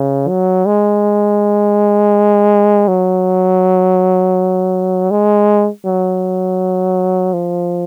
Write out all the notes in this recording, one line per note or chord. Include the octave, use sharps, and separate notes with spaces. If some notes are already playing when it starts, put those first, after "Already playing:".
Already playing: C#3
F#3
G#3
F#3
G#3
F#3
F3